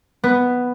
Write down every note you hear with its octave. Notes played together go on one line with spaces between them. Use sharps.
B3